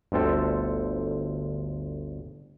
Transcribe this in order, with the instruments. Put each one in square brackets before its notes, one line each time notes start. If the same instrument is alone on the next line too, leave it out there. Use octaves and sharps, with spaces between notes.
[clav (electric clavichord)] G1 D2 C4 A4